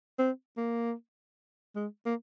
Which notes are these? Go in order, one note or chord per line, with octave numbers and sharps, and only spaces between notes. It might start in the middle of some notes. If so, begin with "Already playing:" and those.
C4
A#3
G#3
A#3